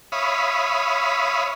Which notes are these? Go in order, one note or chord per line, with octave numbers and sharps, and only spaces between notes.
C#5 E5 F5 B5 D#6